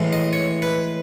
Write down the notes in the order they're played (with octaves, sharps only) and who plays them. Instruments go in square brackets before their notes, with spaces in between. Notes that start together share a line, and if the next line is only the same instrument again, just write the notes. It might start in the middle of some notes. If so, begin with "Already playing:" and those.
Already playing: [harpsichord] A2 E3 G#3
D#5
C#5
B4